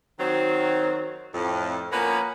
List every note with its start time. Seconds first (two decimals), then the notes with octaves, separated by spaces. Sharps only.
0.19 D#3 F#3 C4
1.34 F2 A2
1.92 F3 A#3 B3 C#4 A#4 B4